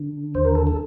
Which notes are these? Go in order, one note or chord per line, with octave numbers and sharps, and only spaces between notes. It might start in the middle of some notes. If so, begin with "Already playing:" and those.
Already playing: D3
D#2 C5
A#4
A4
A4